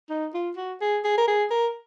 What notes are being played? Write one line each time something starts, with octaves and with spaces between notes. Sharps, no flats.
D#4
F4
F#4
G#4
G#4
A#4
G#4
A#4